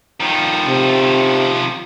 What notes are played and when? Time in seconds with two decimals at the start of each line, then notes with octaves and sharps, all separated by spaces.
0.20 D#3 F3
0.66 C3